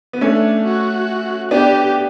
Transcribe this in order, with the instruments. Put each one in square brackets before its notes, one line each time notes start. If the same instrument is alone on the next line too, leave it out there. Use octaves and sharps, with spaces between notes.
[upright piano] B3
[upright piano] A3 C#4 [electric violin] D4
[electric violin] F#4
[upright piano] B3 D4 [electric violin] G4